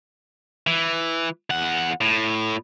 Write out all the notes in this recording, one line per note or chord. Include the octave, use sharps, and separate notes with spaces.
E3
E2 F#5
A2